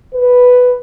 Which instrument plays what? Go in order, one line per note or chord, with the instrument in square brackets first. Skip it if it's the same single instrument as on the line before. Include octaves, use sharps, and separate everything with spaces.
[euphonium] B4